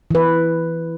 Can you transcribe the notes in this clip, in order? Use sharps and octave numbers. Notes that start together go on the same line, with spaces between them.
E3 B4